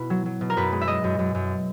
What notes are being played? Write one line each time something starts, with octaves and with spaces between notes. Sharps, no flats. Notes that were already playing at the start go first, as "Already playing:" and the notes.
Already playing: B2 E4 B4
F#3
F#3
B2
A#4
F#2 B4
G#3
E5
G#3 D#5
F#2
F#2
F#2